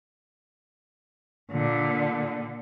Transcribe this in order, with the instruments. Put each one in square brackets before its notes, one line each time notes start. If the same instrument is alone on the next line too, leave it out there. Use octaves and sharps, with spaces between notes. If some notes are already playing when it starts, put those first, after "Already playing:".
[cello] A#2 D3